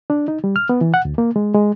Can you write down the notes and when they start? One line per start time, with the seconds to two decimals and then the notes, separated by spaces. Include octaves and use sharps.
0.10 D4
0.28 D#4
0.44 G3
0.56 F6
0.69 B3
0.81 E3
0.94 F#5
1.05 D2
1.18 A#3
1.36 G#3
1.55 G#3